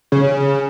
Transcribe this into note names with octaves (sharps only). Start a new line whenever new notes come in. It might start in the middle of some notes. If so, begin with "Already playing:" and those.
C#3